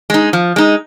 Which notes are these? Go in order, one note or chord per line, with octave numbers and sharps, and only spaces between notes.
G#3 D#4
F3
G#3 D#4